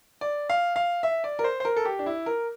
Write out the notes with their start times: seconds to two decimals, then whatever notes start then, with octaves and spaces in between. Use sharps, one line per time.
0.21 D5
0.50 F5
0.76 F5
1.03 E5
1.24 D5
1.39 A#4
1.44 C5
1.60 C5
1.65 A#4
1.76 A4
1.85 G4
1.99 D4
2.06 E4
2.26 A#4